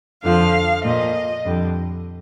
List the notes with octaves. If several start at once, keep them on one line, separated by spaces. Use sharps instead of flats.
F2 D3 F3 F5
A#2 F3 D#5
F2 D3 G3